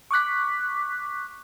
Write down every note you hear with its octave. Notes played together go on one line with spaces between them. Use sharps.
C#6 D6 F#6 B6